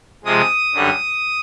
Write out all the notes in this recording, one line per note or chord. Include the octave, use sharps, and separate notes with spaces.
C3 F3 G#3 D#6
F#2 D3 G3